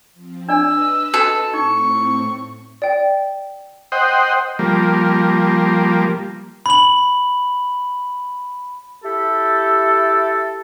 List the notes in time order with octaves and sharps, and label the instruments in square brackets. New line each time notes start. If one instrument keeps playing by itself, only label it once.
[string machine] F3 C4
[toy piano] D4 D5 G#5 [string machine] B4 D#5 [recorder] E6
[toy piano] F#4 [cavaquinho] A4
[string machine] A2 C4 [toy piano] D#4 [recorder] C#6
[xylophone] D5 G5
[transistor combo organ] C5 D#5 F#5 G5
F3 G3 A#3
[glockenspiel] B5 F#7
[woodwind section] E4 G4 A4